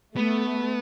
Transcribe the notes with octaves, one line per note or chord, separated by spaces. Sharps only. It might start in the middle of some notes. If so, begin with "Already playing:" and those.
A3 B3